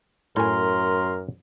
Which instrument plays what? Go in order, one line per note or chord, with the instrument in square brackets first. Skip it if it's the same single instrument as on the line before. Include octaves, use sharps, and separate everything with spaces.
[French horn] F#2 [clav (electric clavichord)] A2 G#5 [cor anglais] A#4 [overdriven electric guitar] C6